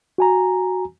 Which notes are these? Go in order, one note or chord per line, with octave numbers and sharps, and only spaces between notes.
F#4 G#5 A#5